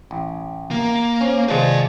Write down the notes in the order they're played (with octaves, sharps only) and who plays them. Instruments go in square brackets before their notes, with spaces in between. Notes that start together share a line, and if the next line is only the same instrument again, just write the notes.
[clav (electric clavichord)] A1
[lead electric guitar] A#3
[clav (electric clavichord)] C#4 [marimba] C5
[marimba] C3 D#3 [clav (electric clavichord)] F3 G#3 [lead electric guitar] B4 D5